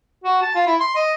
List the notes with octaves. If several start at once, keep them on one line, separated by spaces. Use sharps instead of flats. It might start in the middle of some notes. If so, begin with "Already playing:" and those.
F#4
A5
F4
E4
C6
D#5